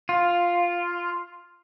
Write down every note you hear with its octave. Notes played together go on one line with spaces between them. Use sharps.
F4